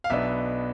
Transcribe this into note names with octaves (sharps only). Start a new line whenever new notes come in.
F5
B1 B2 B3 D4 E5